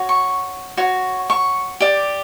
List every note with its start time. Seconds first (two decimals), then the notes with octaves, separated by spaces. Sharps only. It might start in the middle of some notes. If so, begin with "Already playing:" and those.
Already playing: F#4 C#5
0.09 C#6
0.77 F#4 C#5
1.30 C#6
1.80 G4 D5